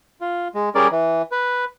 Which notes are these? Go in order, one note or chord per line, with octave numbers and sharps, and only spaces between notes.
F4
G#3
G3 C#4 G#4 A#4 D5
E3
B4